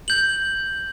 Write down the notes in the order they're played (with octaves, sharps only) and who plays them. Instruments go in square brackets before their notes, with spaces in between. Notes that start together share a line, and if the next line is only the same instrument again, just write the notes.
[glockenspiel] G6 F#7